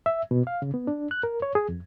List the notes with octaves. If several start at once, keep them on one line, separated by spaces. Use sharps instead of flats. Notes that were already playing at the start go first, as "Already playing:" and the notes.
E5
B2
F5
C#3
B3
D4
F#6
A#4
C#5
G#4
F2